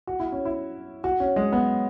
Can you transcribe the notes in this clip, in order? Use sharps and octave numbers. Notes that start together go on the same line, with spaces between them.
F#4
E4
C#4
E4
F#4
C#4
G#3
B3